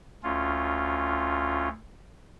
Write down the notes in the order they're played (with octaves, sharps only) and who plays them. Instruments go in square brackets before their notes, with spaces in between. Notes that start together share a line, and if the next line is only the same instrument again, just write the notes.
[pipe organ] D2 C#4 F4